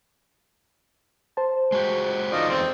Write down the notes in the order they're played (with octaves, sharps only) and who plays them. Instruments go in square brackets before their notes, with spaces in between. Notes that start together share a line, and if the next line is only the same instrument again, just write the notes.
[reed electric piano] C5 A5
[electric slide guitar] G#3 F#4 G4
[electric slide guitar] E2 A4 D5 [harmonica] D#4 F4 D#5
[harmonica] C4 C5